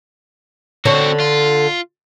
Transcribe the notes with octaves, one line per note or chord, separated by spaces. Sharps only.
D3 C4 F#4 A4 C#5
F4